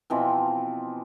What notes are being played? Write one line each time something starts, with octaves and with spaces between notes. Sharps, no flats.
B2 E3 F3 C4